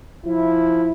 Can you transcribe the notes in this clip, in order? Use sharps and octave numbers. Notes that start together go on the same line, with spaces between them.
F3 E4